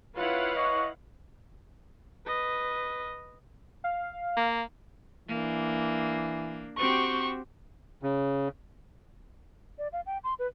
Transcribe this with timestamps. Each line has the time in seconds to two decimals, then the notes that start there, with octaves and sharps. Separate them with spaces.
0.17 E4 F4 B4 C#5 F5 F#5
0.56 D#5 C#6
2.26 B4 D#5
3.84 F5
4.37 A#3
5.29 E3 A#3 D4
6.78 C4 F#4 G4 C#6
8.03 C#3
9.78 D5
9.93 F5
10.06 G5
10.24 C6
10.39 B4